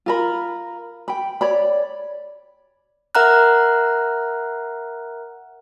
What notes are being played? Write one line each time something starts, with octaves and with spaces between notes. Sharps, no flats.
F4 A#4 B5
G5 B5
C#5 D5 B5
A#4 E5 F#5 A#5 F6 F#6